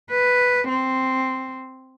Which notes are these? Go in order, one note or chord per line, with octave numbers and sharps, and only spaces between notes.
B4
C4